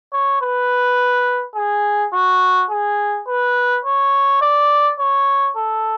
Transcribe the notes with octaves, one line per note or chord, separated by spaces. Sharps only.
C#5
B4
G#4
F#4
G#4
B4
C#5
D5
C#5
A4